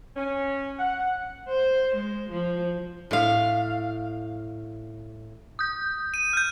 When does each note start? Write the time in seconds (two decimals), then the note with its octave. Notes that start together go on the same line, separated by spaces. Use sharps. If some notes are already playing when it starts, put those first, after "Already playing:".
0.16 C#4
0.79 F#5
1.49 C5
1.95 G#3
2.30 F3
3.11 A2 F5
5.59 D#6 G6
6.14 D#7
6.33 F6 G6